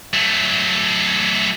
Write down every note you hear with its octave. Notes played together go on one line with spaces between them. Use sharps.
F#3 A3